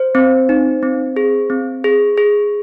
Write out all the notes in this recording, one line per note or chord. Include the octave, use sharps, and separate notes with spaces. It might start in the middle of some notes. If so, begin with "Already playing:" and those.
Already playing: C5
C4
D#4
C4
G#4
C4
G#4
G#4